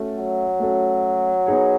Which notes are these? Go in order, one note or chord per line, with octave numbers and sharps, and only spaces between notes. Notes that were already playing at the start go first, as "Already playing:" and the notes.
Already playing: A3 C#4 F#4 A4
F#3
A3 C#4 F#4 A4
B3 D#4 G#4 C#5